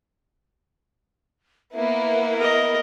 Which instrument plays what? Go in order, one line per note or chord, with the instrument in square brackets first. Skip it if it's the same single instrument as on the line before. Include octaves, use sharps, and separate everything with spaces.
[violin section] A#3 B3 E4 [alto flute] E5
[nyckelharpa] A#4 D#5